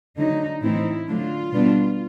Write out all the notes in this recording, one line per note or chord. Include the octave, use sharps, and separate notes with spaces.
D3 F#3 A3 D#4
A2 E3 A3 C4 D#4 E4
D3 F#3 A3 D4 F4
B2 G3 B3 D4